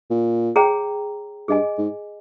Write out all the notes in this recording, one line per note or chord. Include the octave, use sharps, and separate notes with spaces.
A#2
G#4 C#5 G5 A#5
G2 G#4 D#5 G#5
G#2